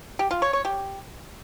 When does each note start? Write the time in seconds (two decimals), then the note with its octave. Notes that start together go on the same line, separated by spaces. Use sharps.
0.19 G4
0.31 F4
0.42 C#5
0.53 C#5
0.65 G4